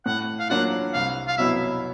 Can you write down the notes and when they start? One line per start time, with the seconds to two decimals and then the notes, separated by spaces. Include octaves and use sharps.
0.06 A2 F#5
0.40 F5
0.50 F#3 A#3 D4 F4 F#5
0.94 C2 F5
1.28 F5
1.38 B2 F#3 B3 E4 E5